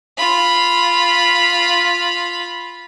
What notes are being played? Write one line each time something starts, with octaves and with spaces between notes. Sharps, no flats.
F4 B5